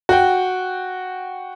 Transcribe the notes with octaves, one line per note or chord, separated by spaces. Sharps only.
F#4 G5